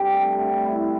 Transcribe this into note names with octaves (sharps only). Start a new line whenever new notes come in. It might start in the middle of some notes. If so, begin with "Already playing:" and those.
Already playing: G2 C4 G4 A4
A3
D3
C3 E4